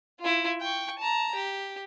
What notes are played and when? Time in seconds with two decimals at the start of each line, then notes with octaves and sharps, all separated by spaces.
0.20 E4 F4
0.61 G5 C#6
0.99 A5 A#5
1.35 G4